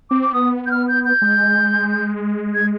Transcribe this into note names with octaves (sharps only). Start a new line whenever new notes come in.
C4 D6
D6
B3 D#6
G6
F6
G6
G6
G#3
G#6